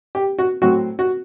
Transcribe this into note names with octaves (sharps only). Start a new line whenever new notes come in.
G4
F#4
A2 F#3 C4 F#4
F#4